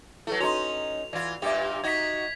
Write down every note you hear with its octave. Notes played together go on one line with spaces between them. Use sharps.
F#3 A3 E4 A4 B4
C#4 D#4 F#4 A#5 C6 F7
E3 F4 D5 F#5
G2 A#2 G4 E5 F5
D#4 F#4 G#6 B6